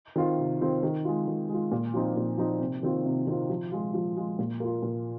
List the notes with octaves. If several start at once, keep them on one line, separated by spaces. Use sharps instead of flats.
D#3 C4 F4
C3
D#3 C4 F4
D#3
G#3 F4
D#3
G#3 F4
A#2
F3 C4 D#4
A#2
F3 C4 D#4
C3
D#3 C4 F4
C3
D#3 C4 F4
F3
G#3 F4
F3
G#3 F4
A#2
A#3 F4
A#2